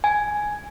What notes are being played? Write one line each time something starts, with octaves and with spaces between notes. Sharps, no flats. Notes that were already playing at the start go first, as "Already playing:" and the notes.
G#5